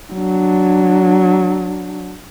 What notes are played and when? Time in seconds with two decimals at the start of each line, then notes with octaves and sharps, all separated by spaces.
0.13 F#3 D4